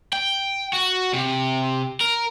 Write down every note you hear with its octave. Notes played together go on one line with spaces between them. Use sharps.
G5
F#4
C3
A#4